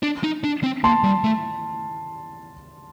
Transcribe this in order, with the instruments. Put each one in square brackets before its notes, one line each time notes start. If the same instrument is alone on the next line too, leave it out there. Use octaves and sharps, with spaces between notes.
[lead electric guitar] D4
D#4
D4
C4
[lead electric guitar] A#3 [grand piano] A5 C6
[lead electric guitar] G3
A3